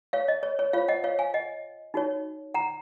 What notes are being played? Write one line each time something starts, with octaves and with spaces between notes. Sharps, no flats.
C#5 F5
D#5
C#5
C#5
F4 C5 C#5 F5
D#5 F#5
C#5 F5
F5 G#5
D#5 F#5
D#4 F#4 C#5
F#5 A#5